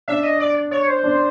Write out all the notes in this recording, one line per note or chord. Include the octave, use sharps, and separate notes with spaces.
D4 E5
D#5
D5
C#5
C5
D4